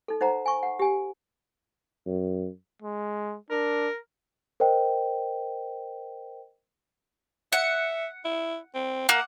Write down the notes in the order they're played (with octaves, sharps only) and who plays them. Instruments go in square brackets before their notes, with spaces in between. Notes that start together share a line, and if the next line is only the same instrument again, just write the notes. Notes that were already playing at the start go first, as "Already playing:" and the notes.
[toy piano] D#4 A4
D#4 C5 F#5 A#5
G#5 C#6
F#5
G4 G#5
[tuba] F#2
[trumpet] G#3
[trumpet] D4 [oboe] A#4
[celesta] A#4 C5 D#5 G5
[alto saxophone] E5 [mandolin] F#5
[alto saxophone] E4
C4
[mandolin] A#3 [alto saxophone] F#5